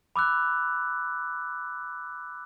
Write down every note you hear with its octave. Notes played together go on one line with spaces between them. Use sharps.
B5 D6 E6 F#6